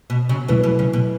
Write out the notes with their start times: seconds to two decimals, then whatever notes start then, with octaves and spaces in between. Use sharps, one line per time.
0.10 B2
0.29 C#3 F#3
0.48 B2 E3 F#3 A3 E4 B4
0.64 B2
0.79 C#3
0.93 B2